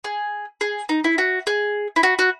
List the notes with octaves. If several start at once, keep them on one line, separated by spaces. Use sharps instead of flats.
G#4
G#4
D#4
E4
F#4
G#4
E4
F#4
F#4